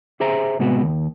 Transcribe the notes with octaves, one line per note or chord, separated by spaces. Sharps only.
G4 G#4 C5 E5 A#5
A2 C3 G#3 B3 F#4
D#2